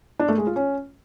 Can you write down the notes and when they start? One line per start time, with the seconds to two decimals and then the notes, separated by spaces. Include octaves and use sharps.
0.19 D4
0.29 A3
0.38 G#3
0.47 F4
0.56 C#4